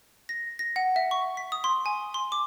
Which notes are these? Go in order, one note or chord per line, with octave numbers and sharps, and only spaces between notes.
A#6
A#6
F#5
E5
C#6
B6
D#6
C6
G#5
C6
D6